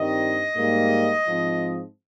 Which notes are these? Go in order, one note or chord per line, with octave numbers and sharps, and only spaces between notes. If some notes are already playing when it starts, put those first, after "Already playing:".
Already playing: G2 D#3 G3 C4 D#5
G#2 G3 A#3
G#2 F3 C4